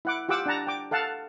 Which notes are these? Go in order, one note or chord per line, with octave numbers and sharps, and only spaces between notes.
E4 F#5 D6
F4 G4 F#5 D6 E6
D4 F#5 A5 A#5
G5 D6
A4 F5 F#5 A5